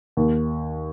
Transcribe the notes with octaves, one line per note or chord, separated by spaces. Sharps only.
D#2